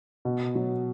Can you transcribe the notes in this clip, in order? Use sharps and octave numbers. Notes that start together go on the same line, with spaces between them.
B2
F#3